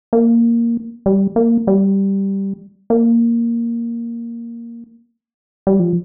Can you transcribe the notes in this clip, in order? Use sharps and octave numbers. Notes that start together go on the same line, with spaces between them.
A#3
G3
A#3
G3
A#3
G3
F3